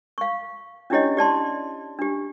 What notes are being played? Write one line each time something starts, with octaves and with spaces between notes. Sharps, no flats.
F5 C#6
C#4 D4 E4 G4 C#5 D#5
G4 D5 A5 C6
D4 G4